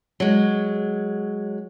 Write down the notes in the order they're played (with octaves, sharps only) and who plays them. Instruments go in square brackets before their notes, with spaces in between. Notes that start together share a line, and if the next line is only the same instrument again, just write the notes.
[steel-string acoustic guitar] F#3 G#3